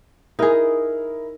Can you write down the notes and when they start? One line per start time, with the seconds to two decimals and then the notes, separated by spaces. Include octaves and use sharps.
0.39 D#4 E4 G#4 A#4